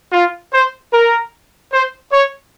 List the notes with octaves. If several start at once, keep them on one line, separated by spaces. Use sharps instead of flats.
F4
C5
A#4
C5
C#5